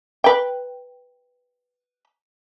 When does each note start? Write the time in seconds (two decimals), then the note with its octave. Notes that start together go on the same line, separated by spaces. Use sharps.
0.24 B4 G5